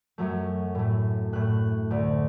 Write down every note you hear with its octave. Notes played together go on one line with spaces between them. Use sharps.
F#2 F#3 A3
A2 A3
A2 A3 F#6
D2 D3 A3